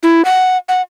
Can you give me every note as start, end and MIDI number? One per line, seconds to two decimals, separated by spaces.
0.03 0.24 64
0.25 0.57 78
0.69 0.82 78